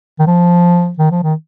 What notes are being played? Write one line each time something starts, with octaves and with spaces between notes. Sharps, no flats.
D#3
F3
D#3
F3
D#3